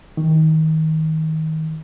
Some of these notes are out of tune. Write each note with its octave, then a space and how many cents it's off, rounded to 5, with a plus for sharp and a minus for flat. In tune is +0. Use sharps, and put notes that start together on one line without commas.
D#3 +25